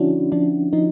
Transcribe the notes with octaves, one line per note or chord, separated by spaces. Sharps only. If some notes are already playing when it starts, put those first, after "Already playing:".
Already playing: D3 F3 C#4 D4 E4 F#4
F3 D4
F3 D#4